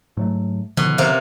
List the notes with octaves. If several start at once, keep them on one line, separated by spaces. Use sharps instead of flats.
G#2 F#3 A3
B2 D3 D#3 F3
C3 A#3